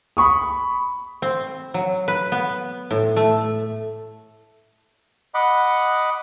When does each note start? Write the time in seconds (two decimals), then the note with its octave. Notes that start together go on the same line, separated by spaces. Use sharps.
0.17 B5 C#6 D#6
1.22 C4
1.74 F#3
2.08 B4
2.32 B3
2.91 A2
3.16 A3
5.34 D#5 F#5 B5 D6